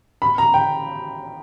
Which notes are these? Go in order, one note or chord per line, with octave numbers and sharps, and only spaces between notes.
B5
A#5
G5